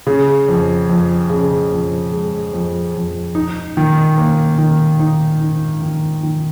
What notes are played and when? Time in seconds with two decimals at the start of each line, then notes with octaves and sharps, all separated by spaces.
0.07 C#3
0.48 F2
0.89 F2
1.30 C#3
1.71 F2
2.12 G#3
2.53 F2
2.94 F2
3.35 D#4
3.77 D#3
4.18 A#3
4.58 D#3
5.00 D#4
5.41 D#4
5.82 D#3
6.23 D#3